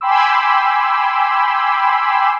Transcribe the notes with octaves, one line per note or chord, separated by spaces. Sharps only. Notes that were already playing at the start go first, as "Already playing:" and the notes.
G5 G#5 B5 C6 D6 E6